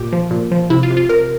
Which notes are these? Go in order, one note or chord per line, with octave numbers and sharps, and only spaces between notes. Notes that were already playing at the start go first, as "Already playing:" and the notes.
Already playing: A#2 G4
F3
A#2
F3
C3 E4
F4
C3
F4
C3 A#4